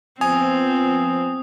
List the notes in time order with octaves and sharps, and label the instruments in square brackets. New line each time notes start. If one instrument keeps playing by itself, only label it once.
[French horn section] F3 B3 C5 [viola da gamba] C4 [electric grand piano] G#5 [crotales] D#6